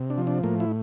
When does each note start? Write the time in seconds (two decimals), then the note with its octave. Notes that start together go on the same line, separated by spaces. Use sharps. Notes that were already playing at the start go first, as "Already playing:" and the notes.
Already playing: C3
0.10 D4
0.18 F3
0.27 D4
0.43 A2 A#3
0.60 E4